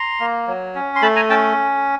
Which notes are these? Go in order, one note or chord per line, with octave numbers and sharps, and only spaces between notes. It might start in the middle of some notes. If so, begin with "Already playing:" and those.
Already playing: A#5 C6
A#3
F#3
C#4
C6
A3 A5 B5
G#5 A#5
C#4 G5 A5